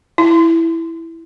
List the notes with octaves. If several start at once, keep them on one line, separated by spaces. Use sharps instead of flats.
E4